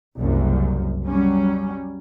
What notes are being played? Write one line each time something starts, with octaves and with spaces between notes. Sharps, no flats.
F#1 C2 F#2
F#3 G3 C#4